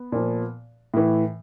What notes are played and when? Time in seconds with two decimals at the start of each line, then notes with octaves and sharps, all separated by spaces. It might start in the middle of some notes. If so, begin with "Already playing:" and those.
Already playing: B3
0.12 A#2 F3
0.94 A2 E3